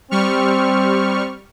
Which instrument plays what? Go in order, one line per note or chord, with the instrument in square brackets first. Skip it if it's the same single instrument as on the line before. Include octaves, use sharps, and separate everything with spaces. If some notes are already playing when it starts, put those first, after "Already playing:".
[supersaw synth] G3 C#6 F6 [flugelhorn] C4